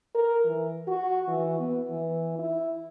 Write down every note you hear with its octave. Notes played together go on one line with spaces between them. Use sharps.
A#4
E3
F#4
E3
B3
E3
E4